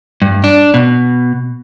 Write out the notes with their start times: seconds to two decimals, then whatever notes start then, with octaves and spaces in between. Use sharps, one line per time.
0.22 G2
0.44 D4
0.74 B2